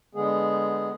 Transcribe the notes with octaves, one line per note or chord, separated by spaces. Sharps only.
D3 G#3 B3 G#4